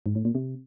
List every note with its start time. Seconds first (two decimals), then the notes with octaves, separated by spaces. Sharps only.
0.06 G#2
0.15 A2
0.25 A#2
0.35 C3